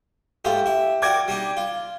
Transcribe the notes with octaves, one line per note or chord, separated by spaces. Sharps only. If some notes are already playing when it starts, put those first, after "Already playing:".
G#2 A3 F4 G4
E4
F#4 A#4 D5 G5 D6 G#6
G3 D4 D#4
F4